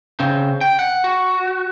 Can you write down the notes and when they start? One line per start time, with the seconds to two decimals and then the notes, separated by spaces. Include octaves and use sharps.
0.20 C#3 C4
0.61 G5
0.79 F#5
1.04 F#4